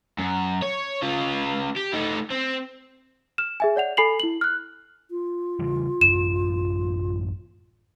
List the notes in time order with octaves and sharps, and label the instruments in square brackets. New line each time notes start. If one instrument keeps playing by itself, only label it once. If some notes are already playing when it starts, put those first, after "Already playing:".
[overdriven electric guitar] F#2
C#5
C#3 F4
G4
A3 D#4
C4
[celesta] F6 E7
G#4 E5 G#5
C#5 D5 F#5 F7
A4 G#5 B5 C7 F7 F#7
E4 F#7
F6 F#6
[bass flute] F4
[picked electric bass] C#3 E3 G3
[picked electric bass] A1 F#2 [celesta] E7